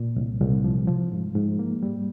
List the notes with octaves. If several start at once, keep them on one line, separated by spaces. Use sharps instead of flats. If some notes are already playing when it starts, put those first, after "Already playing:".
Already playing: A#2
C2
C2
F3
F3
G#2
G#2
A#3
G3